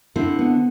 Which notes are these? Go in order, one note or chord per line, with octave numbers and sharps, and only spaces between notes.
D3 C4 E4
B3